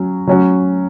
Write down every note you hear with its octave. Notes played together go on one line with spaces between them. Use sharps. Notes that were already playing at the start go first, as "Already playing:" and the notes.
Already playing: F#3 C#4
F#3 C#4 F#4